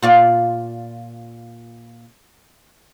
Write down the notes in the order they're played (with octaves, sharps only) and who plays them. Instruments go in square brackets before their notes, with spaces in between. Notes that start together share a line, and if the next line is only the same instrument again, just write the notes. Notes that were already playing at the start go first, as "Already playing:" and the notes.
[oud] A#2 F4 D5